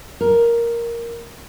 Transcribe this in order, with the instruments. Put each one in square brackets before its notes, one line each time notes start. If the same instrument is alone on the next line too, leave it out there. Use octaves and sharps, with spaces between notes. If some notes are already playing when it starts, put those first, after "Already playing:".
[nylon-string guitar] A#4